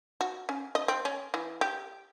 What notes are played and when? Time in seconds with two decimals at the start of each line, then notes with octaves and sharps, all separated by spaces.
0.21 F#4
0.49 C#4
0.75 D#5
0.88 C4
1.05 C#4
1.34 E3
1.61 G4